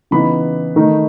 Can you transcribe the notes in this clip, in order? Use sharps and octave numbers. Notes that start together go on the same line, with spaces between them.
C#3 E3 B3 D#4 B5
D#3 A3 D#4